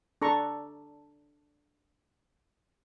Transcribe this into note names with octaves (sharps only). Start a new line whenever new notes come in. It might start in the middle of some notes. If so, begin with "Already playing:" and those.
D4 A4 A#5 C#6